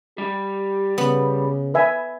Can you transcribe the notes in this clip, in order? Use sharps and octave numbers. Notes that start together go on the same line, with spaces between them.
G3 G4
C#3 B3
B4 E5 G#5